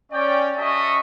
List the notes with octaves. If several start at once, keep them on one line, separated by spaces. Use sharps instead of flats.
C#4 D5 G5
C#4 F#4 A4 D#5 E5 C#6